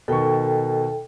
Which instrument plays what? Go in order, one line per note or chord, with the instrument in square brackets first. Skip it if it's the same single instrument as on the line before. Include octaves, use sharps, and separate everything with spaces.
[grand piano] B2 D#3 C#6 [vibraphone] A4 G5